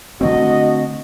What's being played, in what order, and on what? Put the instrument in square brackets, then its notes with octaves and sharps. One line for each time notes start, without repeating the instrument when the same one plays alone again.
[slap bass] D3 A3 C4 [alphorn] F#4 [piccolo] D#5